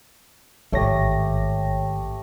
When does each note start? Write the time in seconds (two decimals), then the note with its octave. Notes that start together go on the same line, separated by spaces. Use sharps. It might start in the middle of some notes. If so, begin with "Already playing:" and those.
0.72 A1 G#2 D#3 A3 G4 C#5 A#6